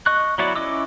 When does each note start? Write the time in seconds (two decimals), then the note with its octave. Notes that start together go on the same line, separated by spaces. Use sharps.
0.06 D#5 C#6 F#6
0.38 F#3 B3 E4 F#4 D5
0.56 C#4 E4 D#5 D6 E6